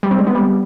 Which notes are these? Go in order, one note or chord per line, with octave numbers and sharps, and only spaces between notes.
G3
C4
G#3
B3
G3